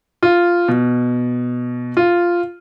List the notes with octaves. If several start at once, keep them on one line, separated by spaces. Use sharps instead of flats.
F4
B2
F4